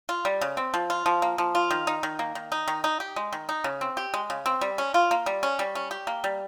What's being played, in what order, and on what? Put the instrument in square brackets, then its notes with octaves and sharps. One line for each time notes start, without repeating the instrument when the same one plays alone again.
[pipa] F4
G3
C#3
C4
F3
F4
F3
A#3
F3
F4
D#3
D#4
D#3
A#3
D#3
D#4
D#3
D#4
G4
G#3
D#3
D#4
C#3
C4
G4
G#3
C#3
C4
G3
C#4
F4
A#3
G3
C#4
G3
C#4
G4
A#3
G3